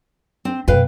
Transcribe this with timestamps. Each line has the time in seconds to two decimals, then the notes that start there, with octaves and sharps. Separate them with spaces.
0.45 C4
0.68 F#2 B2 B4 F5 G5